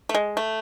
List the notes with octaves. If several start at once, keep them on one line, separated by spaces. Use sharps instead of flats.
A3
G#3
A3